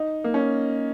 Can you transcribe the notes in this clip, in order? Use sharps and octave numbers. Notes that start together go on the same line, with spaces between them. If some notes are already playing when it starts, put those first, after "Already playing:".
Already playing: D#4
A#3
C#4